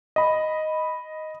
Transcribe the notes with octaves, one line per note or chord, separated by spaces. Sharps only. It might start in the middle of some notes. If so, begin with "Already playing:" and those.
D#5 B5